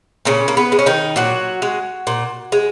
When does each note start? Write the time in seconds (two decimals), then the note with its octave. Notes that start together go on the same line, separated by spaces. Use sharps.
0.25 A#2 C#3 C#4
0.48 A#3
0.57 B3
0.72 G#3
0.79 C#4
0.86 D#3 D#4
1.16 A#2 F#3 F#4
1.62 G#3
2.07 A#2
2.52 G#3